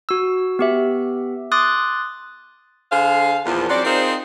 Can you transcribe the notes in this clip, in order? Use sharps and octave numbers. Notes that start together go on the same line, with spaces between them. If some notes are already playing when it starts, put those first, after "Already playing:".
F#4 E6
B3 G4 E5
C6 D6 D#6 F#6 A6
D3 G#4 C5 F5
E2 A#2 F3
F#3 C4 C#4 C5 D5
C4 D#4 F4 G#4 A#4 C5